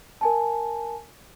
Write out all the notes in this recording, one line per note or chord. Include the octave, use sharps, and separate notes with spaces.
A#4 G#5 A5